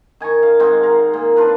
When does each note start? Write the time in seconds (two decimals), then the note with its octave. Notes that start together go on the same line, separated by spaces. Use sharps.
0.20 D#3 G#5 A#5 C#6
0.43 F5
0.60 G#2 G#3 C4
0.83 A#4
1.13 A#2
1.36 D4 F4 A#4 B4